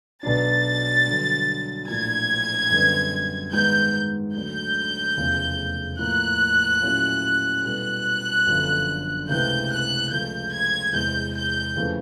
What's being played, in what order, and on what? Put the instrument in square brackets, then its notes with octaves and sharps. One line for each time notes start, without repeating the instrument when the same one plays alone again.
[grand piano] B1 B2 F#3 B3 D4 [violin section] A6
[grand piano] G2 D3 F#3
[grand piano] A#1 A2 F3 A#3 D4 [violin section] G#6
[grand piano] F#2 D3 G3 B3
[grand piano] G#2 D#3 G#3 B3 [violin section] G6
[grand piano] D2 D3 F#3 A3 [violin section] G6
[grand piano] F1 E2 C#3 F3 A3
[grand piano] A2 F3 A#3 [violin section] F#6
[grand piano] A#2 F#3 A3 C#4 E4
[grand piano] B2 G3 B3 E4 A4 [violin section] F#6
[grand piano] G1 F#2 D3 F3
[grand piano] C#2 C3 E3 A3 [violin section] G6
[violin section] F#6
[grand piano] C#2 C#3 F3 A3 [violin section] G6
[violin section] G#6
[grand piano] E2 C3 E3 G#3 [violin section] G6
[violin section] G6
[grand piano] F2 C#3 E3 A3